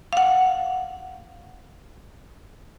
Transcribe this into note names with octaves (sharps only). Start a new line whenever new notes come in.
F5 F#5